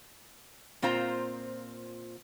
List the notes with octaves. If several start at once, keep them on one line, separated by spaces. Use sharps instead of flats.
A#2 C4 F4 C5 A#5